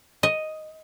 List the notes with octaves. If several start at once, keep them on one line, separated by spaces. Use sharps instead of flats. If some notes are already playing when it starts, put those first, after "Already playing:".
D#5